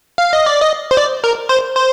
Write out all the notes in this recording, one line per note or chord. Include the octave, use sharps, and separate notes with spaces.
F5
D#5
D5
D#5
C5
D5
A#4
C5
C5